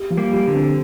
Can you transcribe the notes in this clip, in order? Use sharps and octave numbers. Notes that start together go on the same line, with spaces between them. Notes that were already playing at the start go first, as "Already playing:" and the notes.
Already playing: G4
F3
G3 A#3
G4
D3
C4